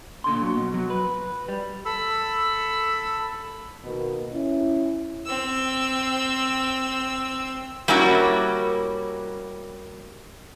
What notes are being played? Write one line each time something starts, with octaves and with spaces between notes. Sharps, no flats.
A#2 D3 C6
F#3
B2
F#3
B4
G3
A4 B5 E6
B2 D#3 A#3
C#4 E4
C4 E6
G3 A#3 C#4 E4 F#4